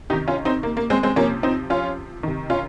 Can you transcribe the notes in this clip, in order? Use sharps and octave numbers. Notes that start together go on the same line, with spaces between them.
C3 D#3 D#4 G4
C#4 F4
C4 D#4
A#3
A#3
G#3 C4
G#3 C4
C3 F3 A#3 C#4
C4 D#4
C#4 F4
C3 D#3
C#4 F4